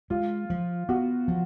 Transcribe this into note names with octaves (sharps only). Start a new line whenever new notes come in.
G#3 F4
F3
B3 F#4
F3